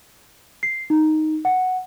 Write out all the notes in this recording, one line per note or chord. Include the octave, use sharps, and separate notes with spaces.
C7
D#4
F#5